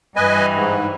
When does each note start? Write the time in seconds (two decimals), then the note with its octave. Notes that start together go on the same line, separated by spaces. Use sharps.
0.16 G2 E3 B4 D#5 G#5
0.55 G#2